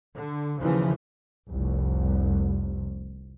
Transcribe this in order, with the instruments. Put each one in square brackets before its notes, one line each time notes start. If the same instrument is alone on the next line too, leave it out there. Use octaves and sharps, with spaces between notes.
[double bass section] D3
D#2 C#3 E3 F3
F1 C2